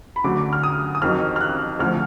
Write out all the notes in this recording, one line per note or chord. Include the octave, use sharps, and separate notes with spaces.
B5
D2 D3 F#3 D6
F6
D#6
D#6
F2 D#3 F#3 F6
F6
F#6
D2 D3 F3 F6